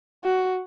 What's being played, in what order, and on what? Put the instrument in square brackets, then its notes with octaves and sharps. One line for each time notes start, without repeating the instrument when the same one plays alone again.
[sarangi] F#4